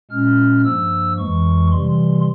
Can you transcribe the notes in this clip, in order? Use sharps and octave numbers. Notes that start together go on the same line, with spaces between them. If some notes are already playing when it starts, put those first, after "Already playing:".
A#2 G#3 C#4 F6
G2 F3 A#3 E6
F2 E3 G#3 C#6
C3 E3 G3 C6